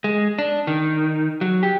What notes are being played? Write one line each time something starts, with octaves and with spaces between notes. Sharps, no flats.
G#3
D4
D#3
F#3
G4